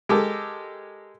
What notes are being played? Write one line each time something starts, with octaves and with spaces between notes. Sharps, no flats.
G#3 G4 A4 A#4